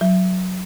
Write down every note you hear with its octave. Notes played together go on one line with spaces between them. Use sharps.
F#3